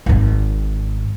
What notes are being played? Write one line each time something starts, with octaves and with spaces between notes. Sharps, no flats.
G#1 G#2